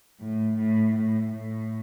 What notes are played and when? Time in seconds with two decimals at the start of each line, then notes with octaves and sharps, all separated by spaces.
0.20 A2
0.57 A2
0.94 A2
1.32 A2